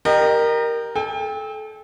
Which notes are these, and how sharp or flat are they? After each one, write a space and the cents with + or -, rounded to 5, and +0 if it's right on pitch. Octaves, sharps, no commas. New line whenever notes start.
G4 +0 A#4 +0 D#5 -35
A4 -30 G5 +30